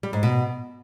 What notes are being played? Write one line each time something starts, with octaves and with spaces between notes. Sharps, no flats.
G3
G#2
B2